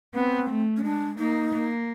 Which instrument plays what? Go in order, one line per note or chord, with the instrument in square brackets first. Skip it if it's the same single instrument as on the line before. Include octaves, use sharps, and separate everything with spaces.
[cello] B3 [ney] C4
[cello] A3
[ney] C#4
[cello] G#3 [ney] D4
[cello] A#3 [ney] D#4
[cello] A#3